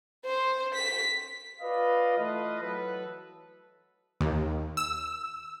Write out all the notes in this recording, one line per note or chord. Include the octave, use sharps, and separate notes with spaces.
C5
B6
F4 B4 D5 D#5 F5
E3 A3 F4 B4 D#5
E3 F#3 A4 B4
D#2
E6